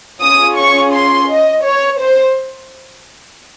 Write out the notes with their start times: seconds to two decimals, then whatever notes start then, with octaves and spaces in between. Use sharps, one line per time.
0.23 C#4 F4 G#4 D#6
0.58 C#6
0.94 C6
1.29 D#5
1.65 C#5
2.01 C5